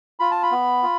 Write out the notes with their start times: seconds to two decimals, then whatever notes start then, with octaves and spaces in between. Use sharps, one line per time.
0.20 F4 B5
0.31 A5
0.43 B5
0.51 B3
0.83 F4